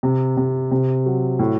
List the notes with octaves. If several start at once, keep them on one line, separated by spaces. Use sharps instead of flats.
C3
C3
C3
F#3
A2